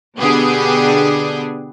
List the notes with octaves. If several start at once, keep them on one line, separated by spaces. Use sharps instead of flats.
B2 D3 B3 D4 G4 G#4